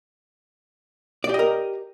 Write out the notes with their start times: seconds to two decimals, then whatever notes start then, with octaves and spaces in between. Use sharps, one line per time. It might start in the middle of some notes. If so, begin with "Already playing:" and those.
1.24 D5
1.29 G4
1.34 D#5
1.39 A#4